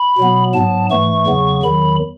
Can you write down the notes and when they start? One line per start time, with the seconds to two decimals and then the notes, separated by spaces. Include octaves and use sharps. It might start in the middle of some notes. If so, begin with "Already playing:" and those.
Already playing: B5
0.18 B2 F#3 B3
0.54 G#2 F#3 B3 A5
0.90 G#2 E3 A3 C#6
1.27 E2 C#3 F#3 B3
1.63 E2 D#3 F#3 B5